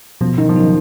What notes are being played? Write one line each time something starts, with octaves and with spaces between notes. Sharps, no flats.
B2 F3
B2 D#3
F3
D#3 F#3